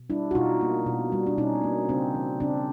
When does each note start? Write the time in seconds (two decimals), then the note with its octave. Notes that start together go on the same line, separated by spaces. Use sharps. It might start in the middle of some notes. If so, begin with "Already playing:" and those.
Already playing: B2
0.10 G3 D4 E4
0.31 F#4
0.35 B2 D#4 F4
0.61 A#3
0.86 B2
1.12 G3
1.27 D4
1.38 B2 C#4 D#4
1.63 A#3
1.89 C#3 C4 D4
2.15 E3
2.40 C#3 C4 D4